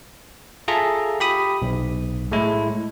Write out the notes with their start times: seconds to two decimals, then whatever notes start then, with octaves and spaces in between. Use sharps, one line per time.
0.68 F4 G#4 A4 E5 A#5
1.20 G4 B5 D#6
1.62 B1
2.32 A2 G#3 E4